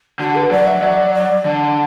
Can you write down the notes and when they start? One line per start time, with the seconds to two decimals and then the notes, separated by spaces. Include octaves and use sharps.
0.19 D3 F#4
0.35 B4
0.51 F#3 D5
0.67 E5
0.82 F#3 D5
1.14 D5
1.45 D3